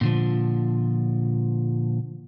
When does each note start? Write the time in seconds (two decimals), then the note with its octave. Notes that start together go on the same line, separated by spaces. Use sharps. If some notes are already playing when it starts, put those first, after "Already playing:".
0.01 A#2 D3 F3